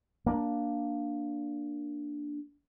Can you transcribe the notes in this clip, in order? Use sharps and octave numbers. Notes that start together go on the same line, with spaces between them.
A#3 D4